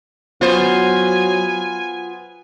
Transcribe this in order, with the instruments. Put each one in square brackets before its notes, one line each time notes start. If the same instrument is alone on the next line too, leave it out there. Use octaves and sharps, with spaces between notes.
[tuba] F#3 [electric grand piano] B3 [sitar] F4 C5 [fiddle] G#5